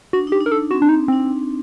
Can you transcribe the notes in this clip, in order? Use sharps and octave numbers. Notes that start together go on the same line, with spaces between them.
D4 F#4
D#4 G4
D4
A#4
A4
C4 F#4
D4
D#4
C4 D4